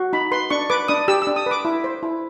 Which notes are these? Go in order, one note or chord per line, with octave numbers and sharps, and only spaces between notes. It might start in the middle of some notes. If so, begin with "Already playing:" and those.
Already playing: F#4
D#4 B5
B4 C6
D4 C#6
B4 D6
D4 D#6
G4 E6
E6
D4
D#6
B4 D6
E4
C5
E4